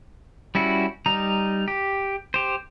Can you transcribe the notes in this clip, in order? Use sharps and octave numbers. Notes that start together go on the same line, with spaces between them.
G3 C#4 E4 F#4
G3 D#4 A#5
G4
G4 C5